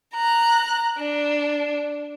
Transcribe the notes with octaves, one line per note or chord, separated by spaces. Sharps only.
A#5 F#6
D4